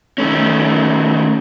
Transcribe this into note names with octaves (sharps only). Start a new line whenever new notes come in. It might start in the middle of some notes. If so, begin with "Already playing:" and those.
D#3 A3 C#4